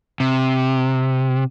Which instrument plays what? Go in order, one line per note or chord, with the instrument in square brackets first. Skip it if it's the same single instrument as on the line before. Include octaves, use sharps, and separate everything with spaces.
[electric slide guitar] C3